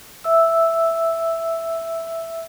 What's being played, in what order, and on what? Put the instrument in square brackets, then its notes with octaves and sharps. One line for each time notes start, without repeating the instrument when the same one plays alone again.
[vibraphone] E5 E6